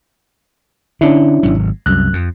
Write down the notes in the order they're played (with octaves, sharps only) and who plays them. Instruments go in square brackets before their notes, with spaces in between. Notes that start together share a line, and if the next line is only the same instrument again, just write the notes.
[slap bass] D3 [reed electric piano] C#4 D4 E4
[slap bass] G#1 C#2 F#3
[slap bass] C2 [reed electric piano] F#2 F#6
[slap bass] F2